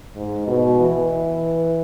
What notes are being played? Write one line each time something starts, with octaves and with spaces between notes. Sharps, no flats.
G#2
B2
E3